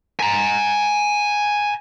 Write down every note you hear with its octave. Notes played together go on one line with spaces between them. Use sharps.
G#5 A#5